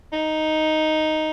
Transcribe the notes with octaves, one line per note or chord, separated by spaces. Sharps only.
D#4